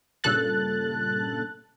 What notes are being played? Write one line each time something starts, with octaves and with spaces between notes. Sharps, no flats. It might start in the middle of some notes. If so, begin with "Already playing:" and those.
G2 A#2 C#3 A4 F#6 A6